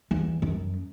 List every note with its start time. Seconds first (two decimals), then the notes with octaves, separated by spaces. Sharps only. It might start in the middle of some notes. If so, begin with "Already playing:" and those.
0.11 E2
0.42 F#2